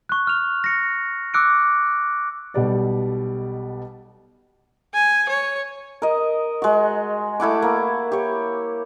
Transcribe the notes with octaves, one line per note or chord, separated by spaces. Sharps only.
C#6 F#6
F6 F7
A#6 C#7
D6 E6 F#6 C#7 D7
B1 B2 G3 D5
G#5
C#5
A#4 D#5
G#3 F#4
A3 E4 F#5 D6
A#3
G4 C#5